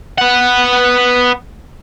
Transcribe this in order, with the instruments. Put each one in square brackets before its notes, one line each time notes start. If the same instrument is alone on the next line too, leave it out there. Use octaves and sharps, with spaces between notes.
[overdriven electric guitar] B3 F#5